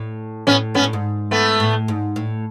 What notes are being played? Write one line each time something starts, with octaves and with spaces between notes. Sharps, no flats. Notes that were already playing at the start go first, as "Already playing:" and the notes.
Already playing: A2
A2 B3 C#4
G#2 B3 C#4
A2
G#2
A3 B3
A2
G#2
A2